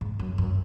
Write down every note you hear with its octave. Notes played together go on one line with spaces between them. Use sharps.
G#2
F#2
F#2